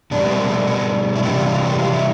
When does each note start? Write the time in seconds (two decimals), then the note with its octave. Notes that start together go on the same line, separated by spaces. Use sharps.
0.11 B2 D4
0.15 G3
0.24 B3
0.30 C4
0.49 A3
0.68 B3
1.16 E4
1.23 C3 E3 G3 D4
1.37 F4
1.51 F4
1.65 G4
1.79 F4
1.92 E4